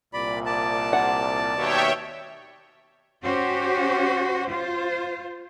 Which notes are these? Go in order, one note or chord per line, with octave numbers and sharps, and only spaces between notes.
C2 A#2 D5 B5
D5 A5
F#5
D#2 B2 C#5 E5 G5
C#4 F#4 G4 C5
F4 C5